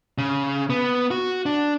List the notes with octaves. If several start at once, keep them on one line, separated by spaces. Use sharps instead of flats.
C#3
B3
F#4
D4